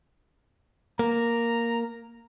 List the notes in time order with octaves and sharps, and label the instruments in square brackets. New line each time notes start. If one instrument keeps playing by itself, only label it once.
[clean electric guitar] A#3 [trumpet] A#5